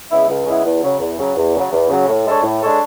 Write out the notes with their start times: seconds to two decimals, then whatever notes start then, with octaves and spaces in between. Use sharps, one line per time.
0.11 C#3 G#3 B3 E4
0.29 C#2
0.46 C#3 G#3 B3 E4
0.65 E2
0.83 C#3 F#3
1.00 E2
1.18 C#3 F#3
1.36 E2
1.55 C#3 F#3
1.72 E2
1.89 C#3 F#3
2.08 A2
2.25 G#3 D4 A4 C#5
2.43 A2
2.61 G#3 D4 A4 C#5